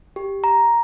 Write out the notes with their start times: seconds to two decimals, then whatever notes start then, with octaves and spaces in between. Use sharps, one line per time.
0.16 G4
0.44 A#5